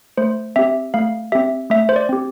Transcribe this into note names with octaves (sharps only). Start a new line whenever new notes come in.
A3 C5
C4 G4 E5
A3 F5
C4 G4 E5
A3 E5
C5
D5
C4 G4